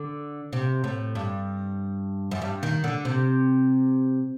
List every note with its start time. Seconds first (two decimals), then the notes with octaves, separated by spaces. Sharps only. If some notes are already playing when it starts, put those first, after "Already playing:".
Already playing: D3
0.53 C3
0.84 A2
1.15 G2
2.31 F#2
2.42 G2
2.63 D#3
2.84 D3
3.05 C3